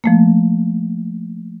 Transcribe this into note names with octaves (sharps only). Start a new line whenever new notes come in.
F3 A3 A#3